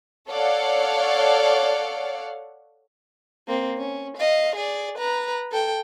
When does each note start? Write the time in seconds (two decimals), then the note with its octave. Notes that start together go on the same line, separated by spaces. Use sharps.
0.29 A4 C#5 D5 F5 F#5
3.48 A#3 C4
3.78 C#4
4.17 D#5 F5
4.56 G#4 D5
4.98 B4 A#5
5.51 A4 G5